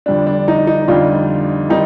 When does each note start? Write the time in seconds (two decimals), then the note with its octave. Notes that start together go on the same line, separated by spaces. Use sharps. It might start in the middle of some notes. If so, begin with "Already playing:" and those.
0.06 F2 D3 G3 D4
0.27 D4
0.48 D#4
0.67 D#4
0.88 F2 D3 G3 D4 F4
1.69 D#3 G3 C4 D#4